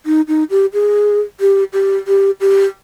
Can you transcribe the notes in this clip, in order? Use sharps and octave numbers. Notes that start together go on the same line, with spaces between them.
D#4
D#4
G4
G#4
G4
G4
G4
G4